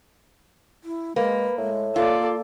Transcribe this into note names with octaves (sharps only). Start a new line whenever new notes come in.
E4
G#3 A#3 B4
A2 G#3
A#3 F4 A4 D5